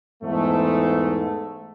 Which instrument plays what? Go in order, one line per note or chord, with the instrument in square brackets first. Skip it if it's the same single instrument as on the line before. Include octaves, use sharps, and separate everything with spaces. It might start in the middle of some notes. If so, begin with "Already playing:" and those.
[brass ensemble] E2 G#2 A3